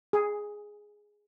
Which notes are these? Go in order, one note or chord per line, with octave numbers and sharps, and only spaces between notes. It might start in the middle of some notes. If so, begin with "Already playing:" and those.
G#4